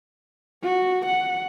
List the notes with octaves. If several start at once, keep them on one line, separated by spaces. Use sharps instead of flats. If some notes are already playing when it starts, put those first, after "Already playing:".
F#4
F#5